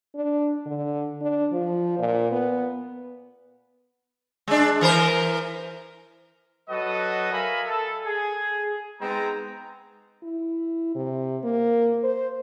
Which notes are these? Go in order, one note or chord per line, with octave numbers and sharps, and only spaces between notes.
D4
D3
D4
F3
A#2
B3
G#3 D4
E3 A#4 C5
F#3 F#4 A4 B4 D#5
A#4 E5 F5 G#5 A#5 B5
A4
G#4
G#3 B3 C4 D#4 A#5
E4
C3
A#3
C5